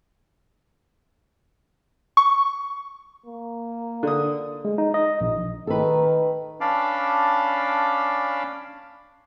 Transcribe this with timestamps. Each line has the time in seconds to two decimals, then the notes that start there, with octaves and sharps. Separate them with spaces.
2.17 C#6
3.26 A#3
4.03 D3 D#6
4.65 G#3
4.78 D#4
4.94 D#5
5.21 A#1
5.67 D#3 A4 B4
6.61 C#4 D4 F5 A5 B5 D6